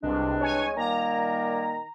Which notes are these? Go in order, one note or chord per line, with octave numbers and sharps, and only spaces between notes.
C2 C3 E3 G#3 C4 D4
C#5 G#5
A#2 D#3 G3 A#3 A#5